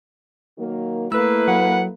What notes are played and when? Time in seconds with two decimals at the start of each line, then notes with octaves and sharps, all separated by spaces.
0.59 D#3 F#3 A#3
1.12 A3 A#3 E4 A4 B4 E6
1.48 F#3 F#5